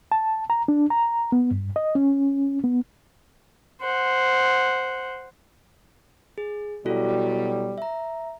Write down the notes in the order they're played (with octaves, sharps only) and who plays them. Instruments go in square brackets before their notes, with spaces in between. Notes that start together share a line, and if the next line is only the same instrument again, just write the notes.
[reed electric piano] A5
A#5
D4
A#5
B3
G2
D#5
C#4
B3
[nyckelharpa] C5 F#5
[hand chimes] G#4
[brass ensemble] B2 F#3 G3 [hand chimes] E4 F#4 A4
[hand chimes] E5 A#5